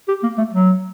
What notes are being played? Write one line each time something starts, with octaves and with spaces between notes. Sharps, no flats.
G4
A#3
A3
F#3